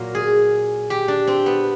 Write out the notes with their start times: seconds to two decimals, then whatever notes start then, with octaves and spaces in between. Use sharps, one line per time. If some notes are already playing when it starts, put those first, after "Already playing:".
Already playing: A#2 F#3 A#3 A#4
0.15 G#4
0.90 G4
1.08 D4
1.27 C4
1.46 B3